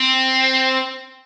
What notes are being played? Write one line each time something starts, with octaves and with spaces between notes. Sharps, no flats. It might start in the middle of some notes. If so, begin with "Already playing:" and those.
Already playing: C4